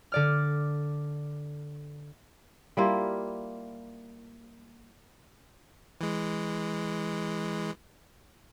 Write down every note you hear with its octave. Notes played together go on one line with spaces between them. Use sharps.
D3 D5 F6
G3 A#3 E4 F4
E3 G#3